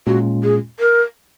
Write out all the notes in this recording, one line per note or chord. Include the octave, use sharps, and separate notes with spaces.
A#2 G#3 C#4 F4 F#4
G#4
A#4